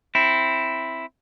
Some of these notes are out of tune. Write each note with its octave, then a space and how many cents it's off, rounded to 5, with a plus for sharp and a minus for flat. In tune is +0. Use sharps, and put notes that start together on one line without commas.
C4 +0 E4 +0